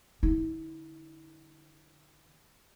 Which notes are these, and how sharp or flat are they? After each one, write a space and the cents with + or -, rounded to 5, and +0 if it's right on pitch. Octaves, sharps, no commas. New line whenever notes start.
D3 +5 E4 -35